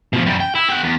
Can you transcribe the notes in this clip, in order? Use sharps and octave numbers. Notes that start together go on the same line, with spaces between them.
B2 F3
F#2 G3
G5
E4
G4 F#5
E2